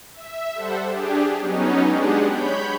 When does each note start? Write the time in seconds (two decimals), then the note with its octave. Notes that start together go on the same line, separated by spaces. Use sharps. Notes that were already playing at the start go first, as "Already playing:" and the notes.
0.14 E5
0.54 G3 A4 C5 F#5
0.86 D4 G4 G#4
1.39 F#3 B3 C#4 D#4
1.87 G#3 D4 G4 G#4 F#5
2.28 C#5 B5 G6